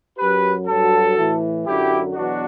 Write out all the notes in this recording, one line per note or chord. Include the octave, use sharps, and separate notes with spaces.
F#2 F#3 G4 B4
G2 F#3 F#4 A4
A2 E3
F#2 D3 F#3 E4 G4
E2 B2 F#3 D4 F#4